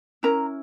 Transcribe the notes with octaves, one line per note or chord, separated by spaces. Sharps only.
C#4 E4 A#4 A#5